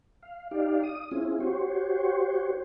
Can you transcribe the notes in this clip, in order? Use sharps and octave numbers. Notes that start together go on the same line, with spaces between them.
F5
D#4 G4 D5 F5
D#6
C4 C#4 E4 F4 G#4
F#4 G4 C5 C#5